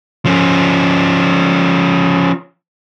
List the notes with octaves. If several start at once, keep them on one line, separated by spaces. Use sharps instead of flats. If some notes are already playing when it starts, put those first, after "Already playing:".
F3 C#4